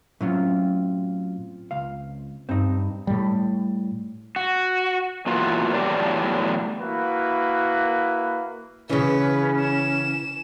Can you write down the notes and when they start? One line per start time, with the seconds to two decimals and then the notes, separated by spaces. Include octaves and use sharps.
0.21 A2 F#3 C4 C#4 F4
1.71 C#2 F5
2.49 G2 C4 D#4
3.07 A2 G3
4.36 F#4
5.26 E2 E3 A#3 F4 F#4
5.74 E2 A2 F#3 D4 G4 D5
6.79 A#3 E4 F#4 B4
8.89 C#3 E3 C#4 B4
9.60 E7